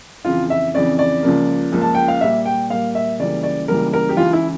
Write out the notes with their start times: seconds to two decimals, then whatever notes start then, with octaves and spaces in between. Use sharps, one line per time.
0.25 F2 C#3 E3 F4
0.50 E5
0.74 F2 C#3 E3 D5
0.99 D5
1.23 C#2 C#3 F3 A#3
1.72 C#2 C#3 F3 A#3
1.81 A5
1.95 G5
2.08 F5
2.21 A#2 G3 A#3 E5
2.46 G5
2.70 A#2 G3 A#3 F5
2.95 E5
3.19 C#2 C#3 E3 G3 A#3 D5
3.43 D5
3.68 C#2 C#3 E3 G3 A#3 A#4
3.93 A#4
4.09 G4
4.17 C#2 C#3 E3 F4
4.33 E4